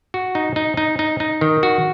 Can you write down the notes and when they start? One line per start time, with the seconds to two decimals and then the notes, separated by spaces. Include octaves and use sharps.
0.14 F#4
0.35 D#4
0.56 D#4
0.77 D#4
0.99 D#4
1.20 D#4
1.41 D#3
1.63 F#4